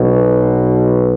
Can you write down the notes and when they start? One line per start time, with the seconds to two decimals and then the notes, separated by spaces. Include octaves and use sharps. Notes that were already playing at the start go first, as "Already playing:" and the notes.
Already playing: B1 B2